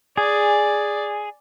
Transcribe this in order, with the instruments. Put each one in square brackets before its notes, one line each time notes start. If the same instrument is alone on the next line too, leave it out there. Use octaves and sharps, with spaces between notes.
[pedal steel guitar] G#4 [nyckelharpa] D5 [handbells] G#5